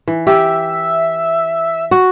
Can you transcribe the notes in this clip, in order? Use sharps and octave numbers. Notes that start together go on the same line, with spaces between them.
E3
G4 E5
F#4